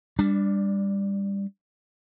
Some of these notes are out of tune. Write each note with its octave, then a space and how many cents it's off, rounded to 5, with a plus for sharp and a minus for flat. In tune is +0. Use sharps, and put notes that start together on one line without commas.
G3 +25 D4 +0